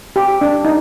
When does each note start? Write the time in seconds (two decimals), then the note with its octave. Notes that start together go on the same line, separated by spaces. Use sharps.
0.16 G4
0.41 D4
0.65 D#4